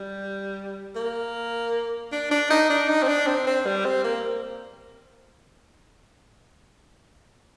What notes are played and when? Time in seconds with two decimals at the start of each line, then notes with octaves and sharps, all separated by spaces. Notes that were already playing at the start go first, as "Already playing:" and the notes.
Already playing: G3
0.96 A#3
2.12 D4
2.31 D4
2.50 D#4
2.70 D4
2.89 D#4
3.03 C4
3.08 D4
3.27 C4
3.47 C4
3.66 G3
3.85 C4
4.04 A#3